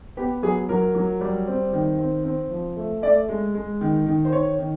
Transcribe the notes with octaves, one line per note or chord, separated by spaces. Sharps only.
B3 G4
F#3 G#4
F#3 A#4
F#3
G3
C4
D#3
C4
C4
F3
A3
A3 D5
G#3
G#3
D#3
D#3
C5
D#3 C#5
D#3